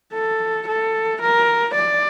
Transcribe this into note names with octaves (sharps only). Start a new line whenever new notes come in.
A4
A4
A#4
D5